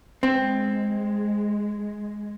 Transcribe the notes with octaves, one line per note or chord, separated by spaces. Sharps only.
G#3 C4